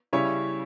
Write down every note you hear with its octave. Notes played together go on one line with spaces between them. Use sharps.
C#3 G3 C#4 E4 C#5